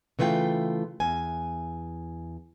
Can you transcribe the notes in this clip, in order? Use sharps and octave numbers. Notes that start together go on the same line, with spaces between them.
C#3 E3 A3 F4 G5
E2 G#5